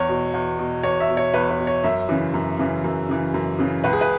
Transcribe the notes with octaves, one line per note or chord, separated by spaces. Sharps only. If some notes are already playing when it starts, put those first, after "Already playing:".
Already playing: E2 C#5
B2
E2
B2
E2 C#5
E5
B2
C#5
E2 B4
B4
B2
C#5
F#2 E5
C#3 E3
F#2
C#3 E3
F#2
C#3 E3
F#2
C#3 E3
C#2 B4
G#4
B4